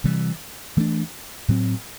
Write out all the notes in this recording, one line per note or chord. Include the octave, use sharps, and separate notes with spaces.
C3 E3 G3
E3 A3 D4
A2 F#3 C4